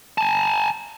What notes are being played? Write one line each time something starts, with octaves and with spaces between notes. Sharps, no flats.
G#5 A5